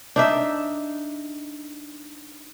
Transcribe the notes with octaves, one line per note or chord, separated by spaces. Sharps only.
D4 D#4 E5